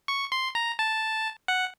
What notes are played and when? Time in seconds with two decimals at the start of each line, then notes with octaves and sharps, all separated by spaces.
0.08 C#6
0.32 C6
0.55 A#5
0.79 A5
1.48 F#5